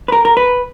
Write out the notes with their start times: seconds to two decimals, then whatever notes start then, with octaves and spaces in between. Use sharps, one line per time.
0.08 B4
0.12 A#4
0.25 A#4
0.37 B4